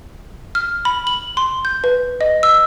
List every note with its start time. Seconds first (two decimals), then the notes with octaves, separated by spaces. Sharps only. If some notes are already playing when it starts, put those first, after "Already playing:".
0.55 F6
0.85 B5
1.07 F#7
1.37 C6
1.65 G6
1.84 B4
2.21 D#5
2.43 E6